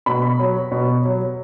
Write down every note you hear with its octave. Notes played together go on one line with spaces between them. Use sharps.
B2 B5
F#3
B2
F#3